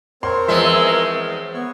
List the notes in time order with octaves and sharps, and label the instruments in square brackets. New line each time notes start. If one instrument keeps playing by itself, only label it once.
[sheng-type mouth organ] C4 C5 C#5 [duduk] A#4 [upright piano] C6
[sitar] E2 G#3 E5 [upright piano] F3
[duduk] B3 [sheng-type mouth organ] C#5